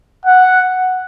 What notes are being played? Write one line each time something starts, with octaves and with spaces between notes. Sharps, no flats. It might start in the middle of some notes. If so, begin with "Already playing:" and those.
F#5